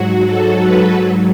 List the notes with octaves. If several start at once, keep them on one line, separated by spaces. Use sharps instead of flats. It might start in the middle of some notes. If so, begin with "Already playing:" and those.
Already playing: G#2 F#3 F#4
A4
B4
G#2 F#3